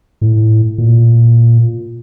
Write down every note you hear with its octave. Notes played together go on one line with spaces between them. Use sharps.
A2
A#2